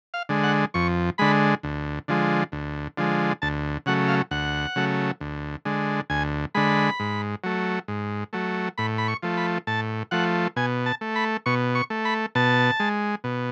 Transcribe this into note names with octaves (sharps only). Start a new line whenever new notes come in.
F5
D3 G#3
F#5
F2 C#6
D3 G#3 B5
D2
D3 F3 G#3
D2
D3 F3 G#3
D2 A5
C#3 F#3 A3 F#5
F5
D2 F#5
C#3 F#3 A3
D2
D3 G#3
D2 G#5
D3 G#3 B5
G#2
F#3 A3
G#2
F#3 A3
A2 B5
B5
C#6
F3 A3
B5
A2 A5
F3 A3 F#5
B2 G#5
A5
A3
B5
B2 C#6
C#6
A3
B5
B2 A5
G#3
B2